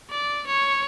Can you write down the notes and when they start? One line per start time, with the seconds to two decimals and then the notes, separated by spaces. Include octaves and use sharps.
0.10 D5
0.47 C#5